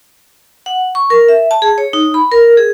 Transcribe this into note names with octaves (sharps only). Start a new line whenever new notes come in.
F#5
C#6
A#4
E5
A5
G#4
C#5
D#4
B5
A#4
G#4